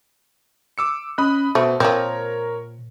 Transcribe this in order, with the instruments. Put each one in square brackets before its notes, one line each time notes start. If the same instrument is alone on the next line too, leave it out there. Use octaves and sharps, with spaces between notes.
[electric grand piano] D6 E6 C#7
[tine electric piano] C#4 F#6 [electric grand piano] D#5 B5 D#6
[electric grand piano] B2 [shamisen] A3 [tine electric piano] C5 A5
[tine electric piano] A#2 [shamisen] F3 C4 [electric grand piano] A#4 C#5